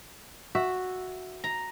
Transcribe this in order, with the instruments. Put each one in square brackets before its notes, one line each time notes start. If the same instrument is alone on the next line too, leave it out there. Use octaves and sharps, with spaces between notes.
[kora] F#4 [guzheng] E5
[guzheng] A#5